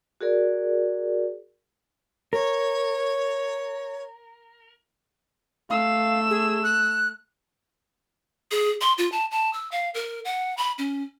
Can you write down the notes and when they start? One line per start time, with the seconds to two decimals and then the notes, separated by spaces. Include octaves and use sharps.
0.21 F#4 G#4 A#4 D5
2.33 A#4 C#5
5.70 A3 F5 E6
6.30 G#4
6.63 F#6
8.51 G#4
8.81 C6
8.98 F4
9.12 A5
9.31 A5
9.53 E6
9.72 F5
9.94 A#4
10.25 F#5
10.57 B5
10.78 C#4